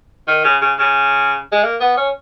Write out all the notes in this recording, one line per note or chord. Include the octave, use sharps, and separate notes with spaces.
D#3
C#3
C#3
C#3
G#3
A#3
B3
C#4